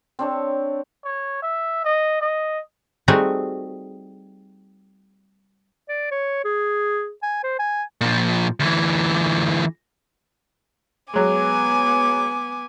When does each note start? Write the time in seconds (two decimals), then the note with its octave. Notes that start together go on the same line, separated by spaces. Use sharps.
0.19 C4 D4 C#5
1.04 C#5
1.42 E5
1.84 D#5
2.21 D#5
3.08 G3 A3 C4 D#4 F#4 G#4
5.88 D5
6.11 C#5
6.44 G#4
7.23 G#5
7.43 C5
7.59 G#5
8.01 A#2 F3
8.60 D2 E3
11.14 F#3 G#3 B3 G#5 D6